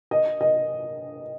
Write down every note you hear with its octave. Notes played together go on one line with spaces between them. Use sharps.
D#5
D#5